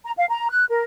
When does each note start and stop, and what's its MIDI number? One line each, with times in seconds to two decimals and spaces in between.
0.04 0.12 82
0.17 0.26 77
0.29 0.50 82
0.50 0.66 90
0.69 0.83 70